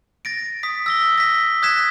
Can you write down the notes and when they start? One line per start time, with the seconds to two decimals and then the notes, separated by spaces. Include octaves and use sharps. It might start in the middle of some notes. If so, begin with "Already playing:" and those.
0.25 A6 A#6 D7
0.63 D#6 B6
0.86 E6 A#6 G7
1.18 A#6 B6
1.62 D#6 F#6 G#6 A#6 B6 E7